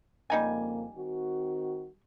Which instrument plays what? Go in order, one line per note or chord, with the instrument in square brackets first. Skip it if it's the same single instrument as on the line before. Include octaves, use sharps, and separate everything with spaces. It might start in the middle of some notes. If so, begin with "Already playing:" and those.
[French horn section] F2 C#3 A#3 [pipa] G3 D#4 G#5
[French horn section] D#3 C4 F#4